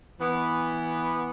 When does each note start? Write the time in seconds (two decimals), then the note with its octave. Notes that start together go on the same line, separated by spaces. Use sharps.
0.20 E3 B3